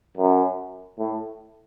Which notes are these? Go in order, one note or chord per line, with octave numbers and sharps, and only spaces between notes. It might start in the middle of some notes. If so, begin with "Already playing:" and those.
F#2
A2